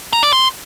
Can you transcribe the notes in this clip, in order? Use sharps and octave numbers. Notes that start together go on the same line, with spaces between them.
A#5
D5
C6